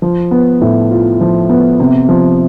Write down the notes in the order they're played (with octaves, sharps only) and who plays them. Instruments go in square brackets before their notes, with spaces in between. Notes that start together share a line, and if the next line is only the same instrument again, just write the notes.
[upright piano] F3
B3
A2
F4
F3
B3
C3
F3